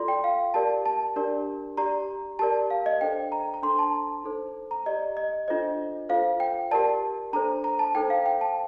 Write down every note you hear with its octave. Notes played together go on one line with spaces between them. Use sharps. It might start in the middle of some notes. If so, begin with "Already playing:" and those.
Already playing: F4 A4 D5 C6
G5
F5
G4 A#4 D5 A5
A5
D4 G4 A#4 D5
G4 D5 A#5
G4 A#4 D5 A5
F5
D#5
D4 A4 C5 G5
A#5
A#5
D4 A4 C5 C6
A5
D#4 A4 C5
A#5
G4 D5 D#5
D#5
D4 F4 A4 C5 D#5
F4 A4 C5 F5
G5
G4 A#4 D5 A5
D4 A4 C5 A#5
A#5
A5
D#4 A4 C5 G5
F5
G5
A5